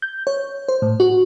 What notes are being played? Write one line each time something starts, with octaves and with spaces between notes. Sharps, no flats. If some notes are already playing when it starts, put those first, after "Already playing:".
G6
C#5
C5
A2
F#4